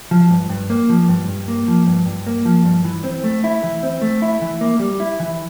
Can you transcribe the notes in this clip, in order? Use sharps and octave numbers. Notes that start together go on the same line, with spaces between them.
F3
G2
G2
A#3
F3
G2
G2
A#3
F3
G2
G2
A#3
F3
G2
E3
C4
A3
E4
E3
C4
A3
E4
E3
A#3
G3
E4
E3